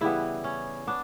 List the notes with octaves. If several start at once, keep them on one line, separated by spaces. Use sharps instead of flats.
C#3 E3 G3 B3 E4
C#4
B3 D4